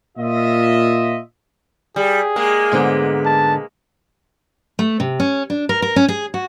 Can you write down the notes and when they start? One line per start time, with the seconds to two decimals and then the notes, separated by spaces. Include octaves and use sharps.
0.18 A#2 F4 D#5 E5
1.96 G3 G#4
2.36 G#3 A#3
2.71 G#2 D3 B3
3.25 A5
4.79 A3
5.00 C3
5.20 C#4
5.50 D4
5.69 A#4
5.82 A#4
5.96 C#4
6.08 G#4
6.34 F#4